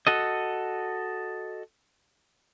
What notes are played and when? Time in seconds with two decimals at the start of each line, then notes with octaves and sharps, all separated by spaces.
0.07 F#4 A4 D#5